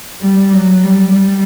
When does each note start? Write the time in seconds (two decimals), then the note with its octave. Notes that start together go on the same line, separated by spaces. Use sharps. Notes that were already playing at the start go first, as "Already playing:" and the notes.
0.22 G3
0.53 F#3
0.84 G3
1.15 G3